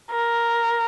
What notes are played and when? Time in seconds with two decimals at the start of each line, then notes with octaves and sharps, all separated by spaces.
0.11 A#4